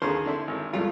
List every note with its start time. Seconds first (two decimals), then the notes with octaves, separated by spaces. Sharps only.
0.02 D#2 D3 G#4 C5
0.26 D3 E4
0.47 G#1
0.73 E2 G#2 G3 A3 F4